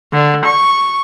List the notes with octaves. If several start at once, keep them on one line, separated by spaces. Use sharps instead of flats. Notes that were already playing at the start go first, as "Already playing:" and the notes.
D3
C#6